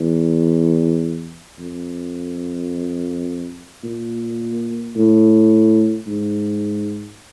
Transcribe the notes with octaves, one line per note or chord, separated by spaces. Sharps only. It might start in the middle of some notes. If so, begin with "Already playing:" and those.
Already playing: E2
F2
A#2
A2
G#2